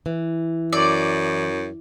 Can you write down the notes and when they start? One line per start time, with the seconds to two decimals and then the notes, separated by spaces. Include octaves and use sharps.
0.06 E3
0.73 F#2 D5